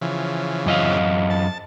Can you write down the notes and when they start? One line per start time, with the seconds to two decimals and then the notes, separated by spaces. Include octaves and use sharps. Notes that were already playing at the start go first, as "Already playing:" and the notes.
0.01 C#3 E3 F3
0.66 F#2 D#5 F5
1.30 A5